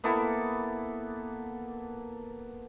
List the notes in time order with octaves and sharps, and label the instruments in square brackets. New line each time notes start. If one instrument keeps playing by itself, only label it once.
[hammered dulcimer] A#3 B3 E4 A4